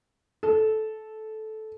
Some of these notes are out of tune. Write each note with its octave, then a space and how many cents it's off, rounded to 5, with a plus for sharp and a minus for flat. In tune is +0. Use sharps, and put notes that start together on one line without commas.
A4 -15